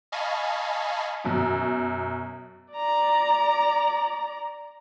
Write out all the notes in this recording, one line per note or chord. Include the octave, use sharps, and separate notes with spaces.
D#5 F5 G#5 A5 B5 C#6
F#2 B2
D5 A#5